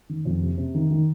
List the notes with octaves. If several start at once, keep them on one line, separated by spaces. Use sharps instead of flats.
D#3
F2
C3
C3
D#3
D#3